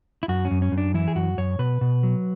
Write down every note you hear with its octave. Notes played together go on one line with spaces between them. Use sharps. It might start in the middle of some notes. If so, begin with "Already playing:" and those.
E4
F#2 F#4
C#4
F#2
C#4
F#2
D4
E3 E4
G#4
F#2 F#4
F#2 C#5
B2 B4
B2
F#3